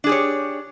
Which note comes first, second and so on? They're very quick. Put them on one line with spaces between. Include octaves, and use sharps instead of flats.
D4 G#4 G4 C#5